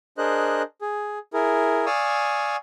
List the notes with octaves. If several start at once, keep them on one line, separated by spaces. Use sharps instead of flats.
D4 G#4 A#4 C5 D#5 F#6
G#4
E4 G#4 A#4
D5 F5 G#5 C#6 D#6 E6